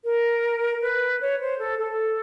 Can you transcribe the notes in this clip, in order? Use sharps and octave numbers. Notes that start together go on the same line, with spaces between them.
A#4
B4
C#5
C5
A4
A4